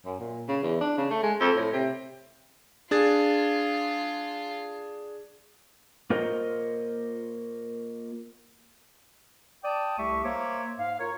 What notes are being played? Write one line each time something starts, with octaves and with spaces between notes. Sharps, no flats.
F#2
A#2
C#3
E2
D4
C#3
A3
G#3
F2
A2
C3
D4 F4 G#4 A6
A#3 F4 A#4 C5 C#5 D#5
D5 G5 A5 D6 D#6
C2 A3 G4 E5 C#6
A#3 C5 C#5 E5 D6
G#2 F5
F4 A#4 C#5